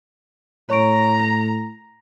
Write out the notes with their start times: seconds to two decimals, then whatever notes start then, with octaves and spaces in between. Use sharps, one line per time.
0.70 A2 C#5 A#5 C#6 D7
1.20 A#6